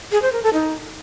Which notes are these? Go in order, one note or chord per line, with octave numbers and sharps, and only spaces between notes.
G#4
C5
A#4
A4
D#4